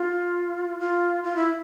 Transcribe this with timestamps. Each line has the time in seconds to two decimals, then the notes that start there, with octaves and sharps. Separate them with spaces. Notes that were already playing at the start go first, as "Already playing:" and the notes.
Already playing: F4
0.80 F4
1.24 F4
1.36 E4